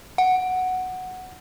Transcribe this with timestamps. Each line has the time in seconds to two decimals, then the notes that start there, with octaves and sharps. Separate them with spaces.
0.18 F#5